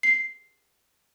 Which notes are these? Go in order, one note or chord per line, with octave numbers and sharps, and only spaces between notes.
C7